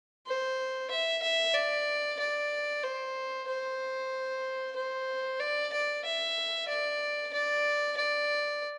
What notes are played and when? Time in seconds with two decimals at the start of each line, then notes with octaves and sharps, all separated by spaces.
0.26 C5
0.90 E5
1.22 E5
1.54 D5
2.19 D5
2.83 C5
3.47 C5
4.76 C5
5.40 D5
5.72 D5
6.04 E5
6.68 D5
7.33 D5
7.97 D5